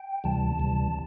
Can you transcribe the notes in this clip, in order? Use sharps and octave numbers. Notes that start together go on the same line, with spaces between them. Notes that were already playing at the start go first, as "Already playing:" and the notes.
Already playing: G5
D2 C3 E3 G3 A5
D2 C3 E3 G3